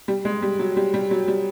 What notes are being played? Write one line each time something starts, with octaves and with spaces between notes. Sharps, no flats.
G3
G#3
G3
F#3
G3
G3
F#3
G3